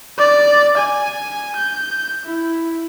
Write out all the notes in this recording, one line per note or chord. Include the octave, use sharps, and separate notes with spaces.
D5
G#5
G6
E4